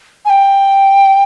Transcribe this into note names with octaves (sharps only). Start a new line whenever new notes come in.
G#5
G5